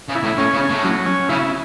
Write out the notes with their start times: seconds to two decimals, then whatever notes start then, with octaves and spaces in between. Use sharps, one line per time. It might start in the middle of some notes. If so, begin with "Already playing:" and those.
0.08 C#3
0.15 E4
0.23 A2
0.38 A2 C#4
0.54 C#3
0.60 C#4
0.69 A2
0.84 F#3
1.06 C#4
1.29 C#3 E4